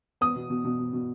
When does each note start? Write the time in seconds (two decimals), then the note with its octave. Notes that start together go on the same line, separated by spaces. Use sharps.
0.21 B3 D#6
0.36 B2
0.50 B2
0.65 B2
0.79 B2
0.93 B2